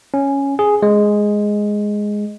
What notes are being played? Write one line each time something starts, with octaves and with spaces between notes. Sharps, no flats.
C#4
G#4
G#3